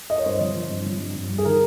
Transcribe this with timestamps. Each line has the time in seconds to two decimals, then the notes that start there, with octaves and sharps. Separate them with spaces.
0.10 D#5
0.18 C#5
0.26 G2 C5
0.41 F3
0.56 F3
0.71 G2
0.86 F3
1.00 G2
1.16 G2
1.30 G2
1.38 G#4
1.45 D#3 A#4